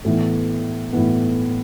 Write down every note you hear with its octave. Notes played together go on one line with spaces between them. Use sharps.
A2 E3 B3
A2 E3 B3